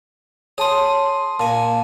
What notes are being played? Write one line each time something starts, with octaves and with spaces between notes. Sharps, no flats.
G#4 C#5 A5 C6 D#6
C6
A#2 G#5 A5